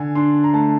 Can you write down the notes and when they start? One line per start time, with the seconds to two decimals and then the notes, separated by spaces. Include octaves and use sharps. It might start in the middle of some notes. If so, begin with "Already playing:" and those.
Already playing: D3 G#5
0.15 D4 C6
0.44 A#5
0.53 A3 A5